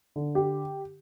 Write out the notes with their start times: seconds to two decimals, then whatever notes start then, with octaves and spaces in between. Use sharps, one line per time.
0.16 D3
0.35 G4